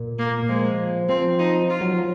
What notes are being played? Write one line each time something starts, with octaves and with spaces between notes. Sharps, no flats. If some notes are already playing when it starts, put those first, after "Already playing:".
Already playing: A#2
A#3
F3 G#3
F3 C4
D#4
F4
F#3
F3